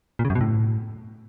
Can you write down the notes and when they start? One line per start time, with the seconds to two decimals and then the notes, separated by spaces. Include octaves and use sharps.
0.19 A#2
0.25 C#3
0.30 F#2
0.35 B2
0.41 A2